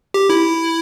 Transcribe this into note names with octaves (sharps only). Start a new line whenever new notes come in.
G4
E4